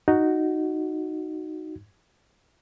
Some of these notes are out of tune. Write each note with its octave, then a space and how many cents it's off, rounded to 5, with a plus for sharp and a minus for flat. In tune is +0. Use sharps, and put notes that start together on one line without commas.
D#4 +0 F#4 +0